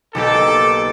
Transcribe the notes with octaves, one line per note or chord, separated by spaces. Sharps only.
B1 A#3 G4 A4 D6